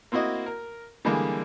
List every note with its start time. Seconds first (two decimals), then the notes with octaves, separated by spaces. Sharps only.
0.12 A#3 C4 E4 F#4 D#5
0.46 A#4
1.05 D3 E3 G3 G#3 A#3